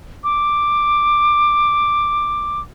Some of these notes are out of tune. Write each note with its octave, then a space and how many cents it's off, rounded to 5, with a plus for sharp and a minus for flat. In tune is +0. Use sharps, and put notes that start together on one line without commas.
D6 +5